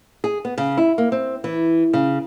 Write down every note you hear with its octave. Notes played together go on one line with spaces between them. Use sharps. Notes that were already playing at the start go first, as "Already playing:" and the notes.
G#4
B3
C#3
E4
A#3
C4
E3
C#3